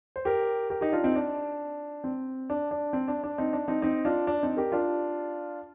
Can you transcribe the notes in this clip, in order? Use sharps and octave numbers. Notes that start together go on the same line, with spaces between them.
C5
G4 A#4
G4 A#4
D#4 G4
D4 F4
C4 D#4
D4
C4
D4
D4
C4
D4
D4
C4 D#4
D4
C4 D#4
C4 D#4
D4 F4
D4
C4 D#4
G4 A#4
D4 F4